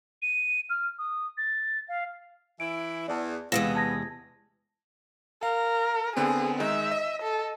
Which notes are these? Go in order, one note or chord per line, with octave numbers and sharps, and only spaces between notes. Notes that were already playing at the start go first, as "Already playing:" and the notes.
D#7
F6
D#6
A6
F5
E3 E4 D7
E2 D5 A5
E2 C3 G#3 B3 F5 A#6 E7
A5 G#6 A#6
A#4 F5
D3 B3 C4 G#4
D#3 G#3 D#4 E5
D#5
A4